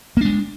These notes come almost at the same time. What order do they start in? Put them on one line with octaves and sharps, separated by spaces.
A#3 D4 G#3